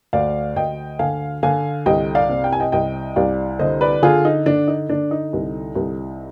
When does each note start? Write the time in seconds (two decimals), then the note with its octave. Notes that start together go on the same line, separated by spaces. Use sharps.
0.13 D2 D5 F5
0.56 D2 D#5 G5
0.99 D3 F5 G#5
1.43 D3 F5 G#5
1.86 C2 D#5 G5
2.15 D5 F5
2.29 C3
2.44 G5
2.53 G#5
2.60 D#5 G5
2.72 C2 D#5 G5
3.16 C2 D5 F5
3.59 D3 C5 D#5
3.81 B4 D5
4.02 D3 F4 G#4
4.25 D#4
4.46 D3 D4
4.68 D#4
4.89 D3 D4
5.11 D#4
5.33 C2
5.76 C2